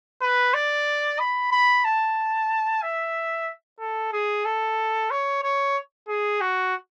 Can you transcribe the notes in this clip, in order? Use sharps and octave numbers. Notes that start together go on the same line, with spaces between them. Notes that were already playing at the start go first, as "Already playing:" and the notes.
B4
D5
B5
B5
A5
E5
A4
G#4
A4
C#5
C#5
G#4
F#4